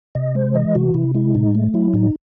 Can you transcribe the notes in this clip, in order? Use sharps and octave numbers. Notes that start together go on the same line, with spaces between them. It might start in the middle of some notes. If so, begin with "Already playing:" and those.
C3 D#5
G#3 C5
E3 D#5
C3 F#4
C3 E4
G#3 E4
A2 D#4
A3
F#3 E4
A2 D#4